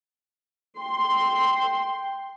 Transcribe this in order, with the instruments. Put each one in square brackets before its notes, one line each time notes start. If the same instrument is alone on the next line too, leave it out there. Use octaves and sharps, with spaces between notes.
[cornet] G5 [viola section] C6